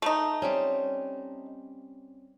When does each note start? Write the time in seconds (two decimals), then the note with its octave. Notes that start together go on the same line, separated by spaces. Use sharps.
0.02 A3 D#4
0.42 G3 C4 C#4